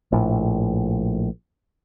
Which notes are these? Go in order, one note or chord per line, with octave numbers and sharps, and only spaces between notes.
A#1 A2